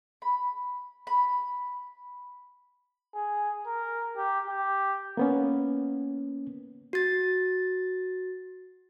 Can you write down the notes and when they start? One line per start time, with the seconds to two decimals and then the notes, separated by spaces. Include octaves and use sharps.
0.22 B5
1.07 B5
3.15 G#4
3.67 A#4
4.16 G4
4.48 G4
5.17 A#3 B3 C#4
6.93 F#4 A6